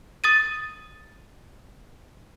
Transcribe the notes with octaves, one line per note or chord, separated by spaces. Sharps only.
D#6 A6 D#7